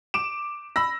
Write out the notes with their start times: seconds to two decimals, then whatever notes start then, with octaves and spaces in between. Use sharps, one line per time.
0.14 D6 D7 E7
0.76 B5 E6 A#6